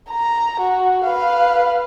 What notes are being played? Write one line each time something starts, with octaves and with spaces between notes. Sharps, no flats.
A#5
F#4
B4 F5